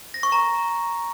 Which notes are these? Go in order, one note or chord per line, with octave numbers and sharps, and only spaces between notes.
A#6
C#6
A#5